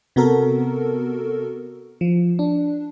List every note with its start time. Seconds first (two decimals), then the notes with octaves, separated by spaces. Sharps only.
0.16 C3 B3 F#4 A4 A#4
2.01 F3
2.39 D4